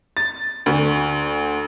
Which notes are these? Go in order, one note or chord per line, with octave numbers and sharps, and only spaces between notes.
A6
D2